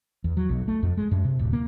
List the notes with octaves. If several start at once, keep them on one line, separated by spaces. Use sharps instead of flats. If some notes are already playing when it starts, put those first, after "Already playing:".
E2
F#3
B1
A3
F2
G#3
F#2
C3
D1
A#3